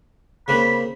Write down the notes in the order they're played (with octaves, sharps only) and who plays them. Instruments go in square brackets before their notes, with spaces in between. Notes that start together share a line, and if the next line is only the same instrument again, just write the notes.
[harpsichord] C#3 A#3 C4 [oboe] B5